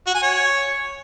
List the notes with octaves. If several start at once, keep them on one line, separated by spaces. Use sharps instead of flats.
F#4
G#5
C#5